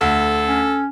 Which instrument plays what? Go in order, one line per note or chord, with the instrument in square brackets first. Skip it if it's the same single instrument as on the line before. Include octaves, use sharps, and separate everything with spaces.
[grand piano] D2 [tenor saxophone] A4
[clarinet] C#4